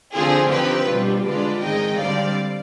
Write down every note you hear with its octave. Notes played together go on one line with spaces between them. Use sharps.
D3 F3 C4 F4 G#4
D3 F3 C4 D#4 G4 B4
B2 G3 D4 F4
D3 G#3 D4 F4 B4 D5
G#2 D#3 G#3 C4 D#4 D#5 G5
D3 G3 C4 D5 F5